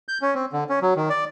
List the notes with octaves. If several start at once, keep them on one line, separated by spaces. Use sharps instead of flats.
G6
C#4
C4
D3
C#4
F#3
D#3
D5